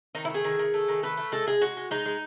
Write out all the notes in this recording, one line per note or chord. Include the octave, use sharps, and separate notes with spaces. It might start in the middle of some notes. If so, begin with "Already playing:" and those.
D#3 D#4
E4
A3 G#4
D#3
D#3
A3
D#3
A3 B4
A3
G#3 A4
G#3 G#4
G#3 F#4
G#3
G#3 D#4
G#3